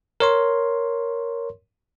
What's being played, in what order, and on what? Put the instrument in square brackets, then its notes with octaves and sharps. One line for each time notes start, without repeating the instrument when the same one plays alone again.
[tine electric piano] A#4 C#5 C6